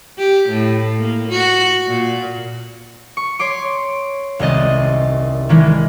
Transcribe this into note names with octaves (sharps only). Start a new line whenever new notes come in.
G4
A2
A#3
F#4
A#2
C#6
C#5 C6 D6
D#1 C2 G#3 D#5 A6
D#3 E3 G#3